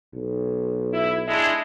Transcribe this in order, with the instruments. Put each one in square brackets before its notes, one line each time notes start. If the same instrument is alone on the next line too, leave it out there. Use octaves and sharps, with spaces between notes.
[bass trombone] B1
[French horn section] E4
G#3 D4 E4